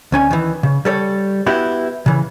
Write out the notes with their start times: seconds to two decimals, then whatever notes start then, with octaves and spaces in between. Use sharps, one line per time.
0.12 D2 C#4 G#5
0.31 D#3 E3
0.63 C#3
0.85 G3 A4 C#5
1.47 B3 E4 F#4 G4
2.06 C#3 E3